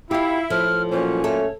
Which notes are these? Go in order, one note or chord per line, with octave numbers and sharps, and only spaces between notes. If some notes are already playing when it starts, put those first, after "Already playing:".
E4 F4 G4 F5
A2 F3 F6
A#2 F#3 C#4 C5
A3 A4 C#5